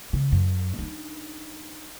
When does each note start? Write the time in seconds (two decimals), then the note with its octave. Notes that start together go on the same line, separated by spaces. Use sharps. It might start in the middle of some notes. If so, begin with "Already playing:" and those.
0.13 C#3
0.32 F#2
0.79 D4 D#4